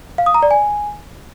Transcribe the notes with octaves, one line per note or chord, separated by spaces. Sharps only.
F5
D#6
A#5
D5
G#5